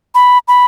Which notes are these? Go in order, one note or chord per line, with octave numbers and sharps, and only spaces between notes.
B5
B5